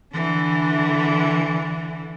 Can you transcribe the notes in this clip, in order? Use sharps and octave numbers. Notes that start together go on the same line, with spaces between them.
D3 E3